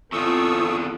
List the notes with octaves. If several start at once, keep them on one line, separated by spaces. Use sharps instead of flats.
E2 D3 C4 F4 A4 C#6 D#6 E6